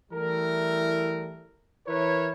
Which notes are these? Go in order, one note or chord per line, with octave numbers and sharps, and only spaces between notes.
E3 G3 A3 E4 A#4
E3 E4 A#4 B4 C#5